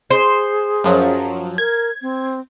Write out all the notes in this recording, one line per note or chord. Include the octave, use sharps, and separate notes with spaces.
G#4 C5
F#2 F3 F#3
A#4 G#6
C4